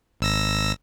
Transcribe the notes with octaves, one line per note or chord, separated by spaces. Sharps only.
G#1 E6 A#6